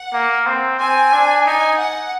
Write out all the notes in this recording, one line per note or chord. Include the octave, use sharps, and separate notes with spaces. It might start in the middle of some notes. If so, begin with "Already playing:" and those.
Already playing: F#5
A#3
C4
C4 G#5
D4
D#4 G#5
F#5